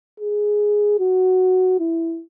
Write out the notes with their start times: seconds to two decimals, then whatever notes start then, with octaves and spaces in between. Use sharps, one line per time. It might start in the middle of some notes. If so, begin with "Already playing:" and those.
0.20 G#4
1.00 F#4
1.80 E4